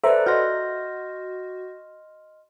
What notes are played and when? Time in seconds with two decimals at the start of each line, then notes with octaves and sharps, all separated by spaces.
0.04 A4 B4 C5 D5 E5 A#5
0.26 F#4 D#5 C6 F6 G6 A#6